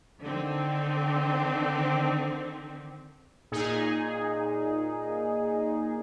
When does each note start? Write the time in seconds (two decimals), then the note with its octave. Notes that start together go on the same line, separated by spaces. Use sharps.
0.21 D3 D#3 C4
3.52 A#2 D#4 G#4